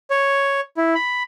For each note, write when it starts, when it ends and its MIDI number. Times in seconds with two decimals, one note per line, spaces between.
0.10 0.60 73
0.77 0.94 64
0.95 1.23 83